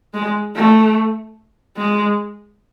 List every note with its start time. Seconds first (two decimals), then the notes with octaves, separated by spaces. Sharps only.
0.14 G#3
0.56 A3
1.78 G#3